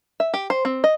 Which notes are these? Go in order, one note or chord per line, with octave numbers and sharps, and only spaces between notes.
E5
G4
C5
C4
D#5